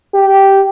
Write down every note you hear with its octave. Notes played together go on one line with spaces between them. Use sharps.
G4